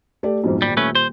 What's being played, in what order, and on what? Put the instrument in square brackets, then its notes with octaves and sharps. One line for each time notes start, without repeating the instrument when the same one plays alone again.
[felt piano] A3 G4 D5
B1 F2 G#2
[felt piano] D#1 [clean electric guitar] G3
[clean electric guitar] A3 C#4 B4
C5